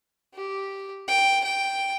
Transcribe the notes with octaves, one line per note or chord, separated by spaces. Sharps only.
G4
G5
G5